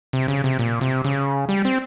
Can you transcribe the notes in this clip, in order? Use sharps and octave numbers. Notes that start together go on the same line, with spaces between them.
C3
C#3
C3
A#2
C3
C#3
G3
C4